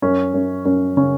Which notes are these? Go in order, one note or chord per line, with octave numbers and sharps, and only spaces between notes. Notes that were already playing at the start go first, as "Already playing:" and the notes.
F#2 C#4
F#2
F#2 C#4
C#3 C#4